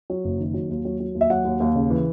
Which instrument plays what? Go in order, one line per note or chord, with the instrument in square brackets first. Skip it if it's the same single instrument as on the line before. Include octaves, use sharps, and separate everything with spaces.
[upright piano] F#3
F#1
D#3
F#3
D#2
F#3
F#3
D#2
E5
F#3 F#5
D#2
D#2
C#3
E3